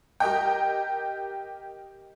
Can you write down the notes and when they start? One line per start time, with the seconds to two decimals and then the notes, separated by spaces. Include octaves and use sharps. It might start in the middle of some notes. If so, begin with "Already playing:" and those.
0.20 G4 A#4 D#5 G5